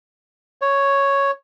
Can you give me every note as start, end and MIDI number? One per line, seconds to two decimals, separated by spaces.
0.62 1.31 73